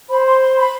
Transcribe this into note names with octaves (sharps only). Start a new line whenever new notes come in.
C5 B5
C6
C6
B5